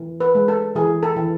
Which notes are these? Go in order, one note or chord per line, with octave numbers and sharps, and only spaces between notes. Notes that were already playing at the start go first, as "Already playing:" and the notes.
Already playing: E3
B4
G#3
A4
E3 G#4
A4
E3